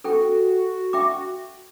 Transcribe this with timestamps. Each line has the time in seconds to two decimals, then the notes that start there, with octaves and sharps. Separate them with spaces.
0.04 F#4 A4 G5
0.93 E5 G5 D6